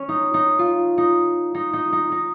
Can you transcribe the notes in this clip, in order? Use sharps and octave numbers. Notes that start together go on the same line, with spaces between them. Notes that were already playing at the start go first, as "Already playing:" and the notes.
Already playing: C#4
D#4
D#4
F4
D#4
D#4
D#4
D#4
D#4